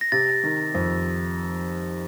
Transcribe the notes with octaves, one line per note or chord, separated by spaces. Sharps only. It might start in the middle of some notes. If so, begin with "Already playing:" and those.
A#6
C3 A6
D#3
F2